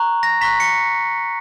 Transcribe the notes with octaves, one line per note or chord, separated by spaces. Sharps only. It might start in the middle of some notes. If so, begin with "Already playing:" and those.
Already playing: A#5 C#6 F#6
A#6
A#5 C#6 F#6 B6
C#7